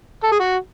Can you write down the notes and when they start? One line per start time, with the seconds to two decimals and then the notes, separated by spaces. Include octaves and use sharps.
0.24 A4
0.32 G#4
0.40 F#4